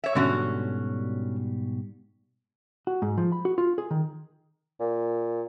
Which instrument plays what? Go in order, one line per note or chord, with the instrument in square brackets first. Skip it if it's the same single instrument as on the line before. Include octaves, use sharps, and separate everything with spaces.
[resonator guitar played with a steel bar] C#5 E5
[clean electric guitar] G#2 B2 G3 [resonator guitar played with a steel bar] D3 C#4 F#4
[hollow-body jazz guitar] F#4
G#2
F3
B5
F#4
F4
G#4
D#3
[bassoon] A#2